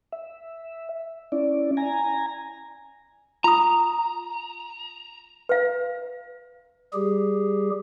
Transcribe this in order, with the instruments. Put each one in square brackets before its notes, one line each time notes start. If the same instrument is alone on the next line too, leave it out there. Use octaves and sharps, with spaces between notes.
[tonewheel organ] E5
C#4 E4 D5
G#5 A#5
[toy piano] F4 D#6 [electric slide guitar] A#5
[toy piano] B4 F5
[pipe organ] G3 G4 G#4